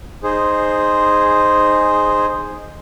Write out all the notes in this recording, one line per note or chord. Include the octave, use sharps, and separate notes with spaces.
D#4 G#4 C5